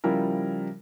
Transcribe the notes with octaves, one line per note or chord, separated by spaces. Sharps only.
C#3 F3 G3 E4 A#4